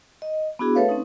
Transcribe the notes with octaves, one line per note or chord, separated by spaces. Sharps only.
D#5
B3 D4 E4 F#4 G#4
A3 A4 B4 C#5 E5 F5
C4 C#4 D#4